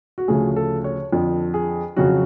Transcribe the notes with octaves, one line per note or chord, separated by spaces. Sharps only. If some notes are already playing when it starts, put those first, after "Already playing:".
F#4
D2 C#3 F3 A3 G#4
A4
C#5
F2 D3 F3
G#4
F2 C#3 F#3 F#4